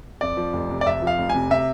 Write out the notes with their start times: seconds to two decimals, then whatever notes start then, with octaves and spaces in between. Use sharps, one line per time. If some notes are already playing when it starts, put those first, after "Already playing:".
0.21 F2 D5
0.37 F3
0.53 F1
0.70 C3
0.81 D5
0.86 F2 E5
1.02 F3
1.07 F5
1.18 F1
1.30 C3 G#5
1.50 C3 E5